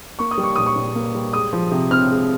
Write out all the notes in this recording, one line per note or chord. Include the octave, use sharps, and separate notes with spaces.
A#3 C#6
D#6
G3
C#6
A#2 D#6
C#6
A#2
A#3
G3
G#3 D#6
F3
C3
C4 F6
G#3